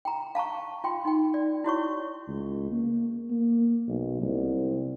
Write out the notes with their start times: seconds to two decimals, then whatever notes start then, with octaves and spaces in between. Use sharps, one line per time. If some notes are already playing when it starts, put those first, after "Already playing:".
0.05 G5 A#5
0.35 F5 A5 A#5 C#6
0.84 F4 G5 C6
1.05 D#4 G5
1.34 D5
1.64 E4 F#4 C#5 C#6
2.28 C#2
2.71 A#3
3.31 A#3
3.88 B1
4.21 C2